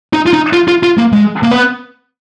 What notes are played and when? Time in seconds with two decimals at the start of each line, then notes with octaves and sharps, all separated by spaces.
0.13 D#4
0.26 F4
0.33 D#4
0.53 F4
0.68 F4
0.83 F4
0.98 A#3
1.12 G#3
1.43 A#3
1.51 B3